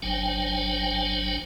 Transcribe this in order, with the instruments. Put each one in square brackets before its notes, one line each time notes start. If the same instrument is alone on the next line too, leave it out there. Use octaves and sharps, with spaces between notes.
[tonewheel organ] G1 F#3 D4 C5 G5 G#5